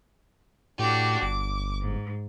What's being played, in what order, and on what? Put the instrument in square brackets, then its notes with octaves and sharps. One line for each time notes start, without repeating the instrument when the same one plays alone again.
[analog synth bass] A2 [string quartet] D4 F#4 G4
[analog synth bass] G1 [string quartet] D6
[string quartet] G#2